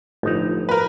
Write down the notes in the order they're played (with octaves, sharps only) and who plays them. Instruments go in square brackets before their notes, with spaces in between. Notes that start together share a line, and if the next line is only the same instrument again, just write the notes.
[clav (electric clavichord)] G1 D#4 [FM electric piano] A2 F3
[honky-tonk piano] A#4 B4